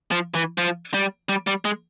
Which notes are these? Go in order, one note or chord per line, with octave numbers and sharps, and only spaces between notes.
F3
E3
F3
G3
G3
G3
G#3